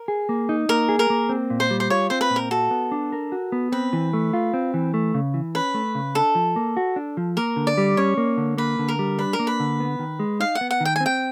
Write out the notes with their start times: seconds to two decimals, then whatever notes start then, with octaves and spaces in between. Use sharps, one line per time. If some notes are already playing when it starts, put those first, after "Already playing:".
Already playing: A#4
0.08 G#4
0.29 A#3
0.49 D#4
0.69 A#3 A#4
0.89 G#4
0.99 A#4
1.10 A#3
1.29 C4
1.50 A#2
1.60 C5
1.70 G3
1.80 C5
1.90 F4 C#5
2.10 C4 C5
2.21 B4
2.30 A#2
2.36 A#4
2.51 F#4 A4
2.71 B3
2.92 D4
3.12 A#4
3.32 F#4
3.52 B3
3.72 C4 B4
3.93 E3
4.13 A3
4.33 F4
4.54 C4
4.74 E3
4.94 A3
5.14 C#3
5.34 E3
5.55 C#4 B4
5.74 A3
5.95 C#3
6.15 D4 A4
6.35 F3
6.56 A#3
6.77 F#4
6.96 D4
7.17 F3
7.37 A#3 A#4
7.56 D3
7.67 D5
7.78 G3
7.97 C#4 C#5
8.17 A#3
8.37 D3
8.58 A#3 B4
8.79 D3
8.88 A#4
8.99 G3
9.19 D4 B4
9.33 A#4
9.39 A#3
9.47 B4
9.60 D3
9.80 B3
9.99 D#3
10.19 G#3
10.40 D#4 F5
10.55 F#5
10.61 B3
10.71 F#5
10.80 D#3 G5
10.96 G#5
11.00 C4
11.06 G5